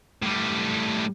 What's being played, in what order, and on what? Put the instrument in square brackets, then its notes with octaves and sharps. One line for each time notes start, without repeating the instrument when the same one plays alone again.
[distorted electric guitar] A2 G3